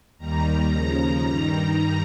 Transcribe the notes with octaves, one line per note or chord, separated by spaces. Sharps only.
D#2 D#3 G3 A#5
D#2 C#3 F3 A#5
G2 D#3 G3